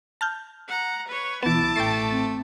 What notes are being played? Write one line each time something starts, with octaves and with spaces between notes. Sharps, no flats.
A5 F6 G6
F#5 A#5
B4 C#5
B1 E3 B3 E4 A5 D6
A1 A3 G5 A6 C7
C4